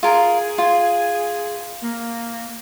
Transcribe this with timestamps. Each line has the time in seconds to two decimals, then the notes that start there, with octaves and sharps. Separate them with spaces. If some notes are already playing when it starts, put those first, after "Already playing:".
0.03 F4 G#4 A#4
0.58 F4
1.82 A#3